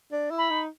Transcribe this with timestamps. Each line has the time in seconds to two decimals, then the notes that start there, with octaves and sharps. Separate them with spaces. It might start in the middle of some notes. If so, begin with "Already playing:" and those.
0.12 D4
0.31 E4
0.38 B5
0.50 D#4